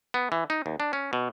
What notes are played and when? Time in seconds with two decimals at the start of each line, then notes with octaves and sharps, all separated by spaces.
0.14 B3
0.32 E3
0.50 D#4
0.66 D#2
0.80 D4
0.93 C#4
1.13 B2